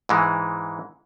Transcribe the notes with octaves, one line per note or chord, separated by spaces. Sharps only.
G#2 E3 G#3